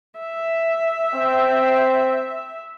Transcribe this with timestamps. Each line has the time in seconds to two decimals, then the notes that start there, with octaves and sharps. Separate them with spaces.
0.20 E5
1.14 C4